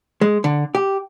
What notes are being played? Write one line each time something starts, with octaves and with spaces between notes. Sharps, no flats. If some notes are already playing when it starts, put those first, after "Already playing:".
G#3
D3
G4